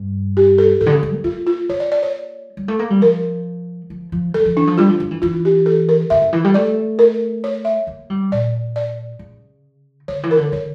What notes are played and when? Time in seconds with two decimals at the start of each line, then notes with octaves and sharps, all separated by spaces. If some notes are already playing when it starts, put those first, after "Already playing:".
Already playing: G2
0.37 G4
0.58 A4
0.81 A2 A4
0.86 D3
0.92 C#3
1.03 E3
1.14 A#3
1.24 A#3 F4
1.47 F4
1.69 A#3 C#5
1.80 D5
1.92 D5
2.03 C#5
2.57 G3
2.68 A3
2.79 A#3
2.90 G3
3.01 F3 A#4
3.90 F3
4.12 F3
4.34 F3 A4
4.46 F3
4.56 E3 D4
4.67 F3
4.78 G3 F4
4.89 F3
5.00 F3
5.11 E3
5.22 E3 F4
5.45 G4
5.66 A4
5.89 A#4
6.10 C#3 E5
6.22 C#3
6.33 E3
6.44 G3
6.54 A3 D5
6.99 A#4
7.44 C#5
7.65 E5
7.87 A#3
8.10 G3
8.32 A#2 D5
8.76 D5
9.19 C#3
10.08 D3 C#5
10.23 E3
10.31 A#4
10.37 D3
10.52 D3 C#5